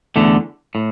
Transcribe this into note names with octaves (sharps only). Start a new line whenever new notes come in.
E2 D3 A3
A2